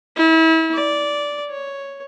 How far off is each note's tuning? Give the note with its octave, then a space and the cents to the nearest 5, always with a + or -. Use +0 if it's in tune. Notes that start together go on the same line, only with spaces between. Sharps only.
E4 -35
D5 -10
C#5 +0